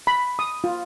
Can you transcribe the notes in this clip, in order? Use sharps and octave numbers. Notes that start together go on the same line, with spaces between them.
B5
D#6
F4